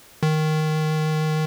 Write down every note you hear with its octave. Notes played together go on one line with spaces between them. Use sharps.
D#3